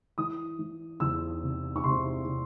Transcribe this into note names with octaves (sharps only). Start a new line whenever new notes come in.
E3 D#6
E3
E2 E6
C3
C#6
C3 C6
C3